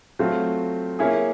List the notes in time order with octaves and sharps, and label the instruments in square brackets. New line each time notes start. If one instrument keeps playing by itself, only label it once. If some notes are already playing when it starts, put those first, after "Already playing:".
[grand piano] F#3 A3 C4 F4
A#3 C#4 E4 G#4